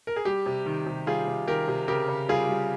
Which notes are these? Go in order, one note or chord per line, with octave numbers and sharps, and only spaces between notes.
A#4
G#4
G3 G4
C3
D#3
C3
G3 F4 G#4
C3
D#3 G4 A#4
C3
C#3 G4 A#4
C#3
G3 F4 G#4
G3